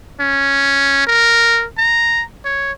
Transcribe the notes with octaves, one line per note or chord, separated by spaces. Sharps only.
C#4
A#4
A#5
C#5